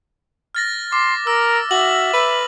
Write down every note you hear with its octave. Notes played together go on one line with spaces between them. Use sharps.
F6 A6 A#6
C6 D6
A#4 E6
F#4 E5 F#7
B4